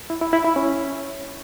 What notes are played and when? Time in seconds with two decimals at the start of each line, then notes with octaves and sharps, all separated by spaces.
0.10 E4
0.21 E4
0.33 E4
0.45 E4
0.56 C#4